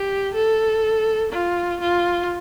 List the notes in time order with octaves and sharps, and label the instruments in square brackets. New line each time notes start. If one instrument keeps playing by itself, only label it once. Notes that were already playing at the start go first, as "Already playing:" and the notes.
Already playing: [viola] G4
A4
F4
F4